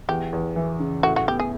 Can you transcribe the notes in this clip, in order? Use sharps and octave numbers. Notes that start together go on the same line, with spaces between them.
E2 G4
E2
E3
C#3
A2 F#4
F#4
B3 G4
G#4